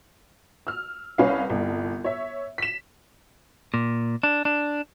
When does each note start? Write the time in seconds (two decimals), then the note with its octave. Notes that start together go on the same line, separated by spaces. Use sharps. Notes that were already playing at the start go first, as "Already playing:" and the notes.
0.67 E6 F6
1.18 C2 C#4 B4 F5
1.50 G1 C2
2.04 C#5 E5
2.58 B6 E7
3.74 A#2
4.23 D4
4.45 D4